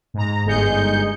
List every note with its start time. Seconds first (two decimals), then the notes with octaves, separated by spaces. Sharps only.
0.14 G#2 A#5
0.45 G1 G#3 D#4 G#4 G6 C#7